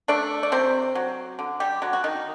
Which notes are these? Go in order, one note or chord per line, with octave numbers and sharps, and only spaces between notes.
A3 D4 D5
D5
C3 C4 C5
F#3
D3
G3 G4
D3 F#3 F#4
F#4
D#3 D#4